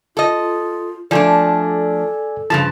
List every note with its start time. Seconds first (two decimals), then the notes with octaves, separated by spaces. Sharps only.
0.17 F4 A4 D#5
1.11 F3 A3 D4 A4 D5 G#5
2.50 G2 C#3 F3 A5